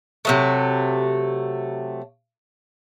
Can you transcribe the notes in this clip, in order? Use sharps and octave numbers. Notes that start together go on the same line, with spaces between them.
C3 F#3 A3